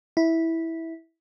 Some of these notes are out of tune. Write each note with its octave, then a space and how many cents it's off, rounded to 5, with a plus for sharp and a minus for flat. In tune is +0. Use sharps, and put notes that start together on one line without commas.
E4 -10